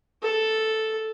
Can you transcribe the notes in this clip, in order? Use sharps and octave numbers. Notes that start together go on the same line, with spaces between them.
A4